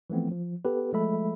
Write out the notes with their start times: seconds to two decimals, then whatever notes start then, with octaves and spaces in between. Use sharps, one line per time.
0.10 E3 F3 A3 B3 C4
0.31 F3
0.65 B3 G4 A4 B4
0.92 F3 G#3 A3 A4 E5 B5